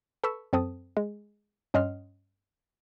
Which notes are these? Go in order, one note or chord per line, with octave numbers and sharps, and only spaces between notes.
A4 B4 B5 C#6 E6
F#2 C4 A4 D#6
G#3
G2 C#4 D#5 F#5 C6 F6